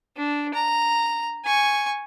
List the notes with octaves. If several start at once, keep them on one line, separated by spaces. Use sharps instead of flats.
D4
A#5
G#5 C#6